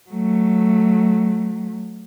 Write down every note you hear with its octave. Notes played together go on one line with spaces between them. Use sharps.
F#3 A3